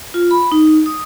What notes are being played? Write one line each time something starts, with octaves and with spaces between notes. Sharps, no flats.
F4
B5
D#4
D#6